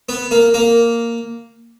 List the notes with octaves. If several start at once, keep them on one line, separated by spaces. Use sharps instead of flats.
B3
A#3
A#3